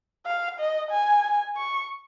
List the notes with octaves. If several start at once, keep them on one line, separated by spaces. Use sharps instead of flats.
F5
D#5
G#5
C#6